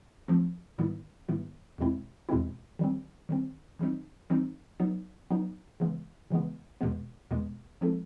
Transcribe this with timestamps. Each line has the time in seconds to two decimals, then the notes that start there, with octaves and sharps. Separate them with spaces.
0.28 F3 A3 C4
0.78 G#2 D#3 G3 B3 E4
1.28 G#2 D#3 G3 B3 E4
1.78 E2 B2 G#3 C4 E4
2.29 E2 B2 G#3 C4 E4
2.79 D#3 G3 C4
3.29 D#3 G3 C4
3.79 E3 G3 C4 D#4
4.30 E3 G3 C4 D#4
4.80 F#3 B3 D#4
5.31 F#3 B3 D#4
5.80 C#3 E3 G#3 B3
6.31 C#3 E3 G#3 B3
6.81 E2 B2 G#3 B3
7.31 E2 B2 G#3 B3
7.81 F3 G#3 C4 E4 A4